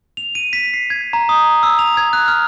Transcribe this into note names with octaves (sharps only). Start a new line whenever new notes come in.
F7
D#7
B6
C7
G#6
A#5
D#6
E6
F7
G#6
F#6
F6